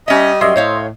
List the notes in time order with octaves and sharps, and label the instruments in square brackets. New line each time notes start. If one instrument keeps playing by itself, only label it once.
[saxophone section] G3 D#5 [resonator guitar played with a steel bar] C#4 E5
[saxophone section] F#2 G3 [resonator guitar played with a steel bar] F#3 [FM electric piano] D#5 E5 C6
[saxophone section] A2 [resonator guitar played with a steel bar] C5 C#5 F5